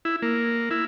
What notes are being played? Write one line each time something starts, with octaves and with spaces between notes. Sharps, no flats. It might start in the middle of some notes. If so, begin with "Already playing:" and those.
E4
A#3
E4